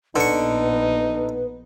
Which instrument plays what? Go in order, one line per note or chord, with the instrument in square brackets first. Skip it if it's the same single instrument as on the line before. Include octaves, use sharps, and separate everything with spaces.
[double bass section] A#1 B3 [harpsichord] D3 C#6 [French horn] D#4 [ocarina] B4